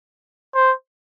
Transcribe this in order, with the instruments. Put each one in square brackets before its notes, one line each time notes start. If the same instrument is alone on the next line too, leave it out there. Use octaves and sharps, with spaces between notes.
[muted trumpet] C5